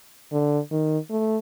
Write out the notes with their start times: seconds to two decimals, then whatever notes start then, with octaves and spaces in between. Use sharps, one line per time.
0.32 D3
0.71 D#3
1.10 A3